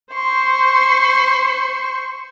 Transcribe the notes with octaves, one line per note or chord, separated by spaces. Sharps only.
C5 C6 C#6